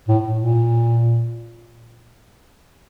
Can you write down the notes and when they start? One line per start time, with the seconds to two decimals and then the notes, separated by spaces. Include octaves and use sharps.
0.08 A2
0.39 A#2